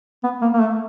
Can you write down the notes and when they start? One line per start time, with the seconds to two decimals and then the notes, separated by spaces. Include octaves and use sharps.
0.24 B3
0.42 A#3
0.54 A#3
0.60 A3